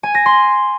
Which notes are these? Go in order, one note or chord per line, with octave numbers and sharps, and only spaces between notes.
G#5
A#6
C6